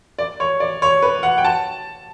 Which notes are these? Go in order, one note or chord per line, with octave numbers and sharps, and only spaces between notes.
D5
C#5
D5
C#5
B4
F#5
G5
A5